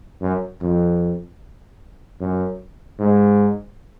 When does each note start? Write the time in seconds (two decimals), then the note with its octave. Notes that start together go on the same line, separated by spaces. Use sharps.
0.21 F#2
0.62 F2
2.20 F#2
2.99 G#2